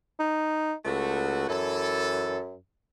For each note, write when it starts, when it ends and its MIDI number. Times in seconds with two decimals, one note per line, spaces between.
0.20 0.74 63
0.85 1.47 37
0.85 1.45 57
0.85 1.45 66
1.49 2.56 42
1.49 2.38 52
1.49 2.38 69